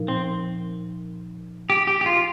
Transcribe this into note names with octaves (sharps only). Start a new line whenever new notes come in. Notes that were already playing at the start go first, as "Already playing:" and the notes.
Already playing: A#2 F3 D#4 A#4
C4
G4
G4
G4
F4